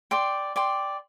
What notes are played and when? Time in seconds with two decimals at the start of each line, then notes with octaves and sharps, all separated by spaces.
0.11 D5 G5 C6
0.56 D5 G5 C6